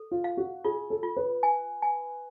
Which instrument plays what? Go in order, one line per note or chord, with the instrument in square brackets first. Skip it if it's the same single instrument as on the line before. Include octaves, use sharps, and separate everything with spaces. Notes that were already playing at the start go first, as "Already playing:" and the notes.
Already playing: [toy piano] A4
[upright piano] F4
[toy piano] F5
[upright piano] F#4
[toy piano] F4 [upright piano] G#4
[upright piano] A4
[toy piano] F4
[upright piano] B4
[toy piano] G#5
G#5